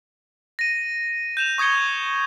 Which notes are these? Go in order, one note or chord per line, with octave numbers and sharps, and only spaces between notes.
A#6 D#7
G6 E7 F7
C#6 D#6 G#6 C#7 G7